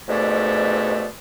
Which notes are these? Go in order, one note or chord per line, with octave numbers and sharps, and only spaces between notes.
F2 G#2 B2 A3 D5